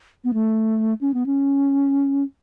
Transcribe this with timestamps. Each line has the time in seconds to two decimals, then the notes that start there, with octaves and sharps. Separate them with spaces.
0.24 B3
0.34 A3
1.01 C#4
1.14 B3
1.26 C#4